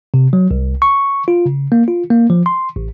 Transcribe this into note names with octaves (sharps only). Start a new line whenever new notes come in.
C3
F#3
C2
C#6
F4
C#3
A#3
F4
A#3
F3
C6
A1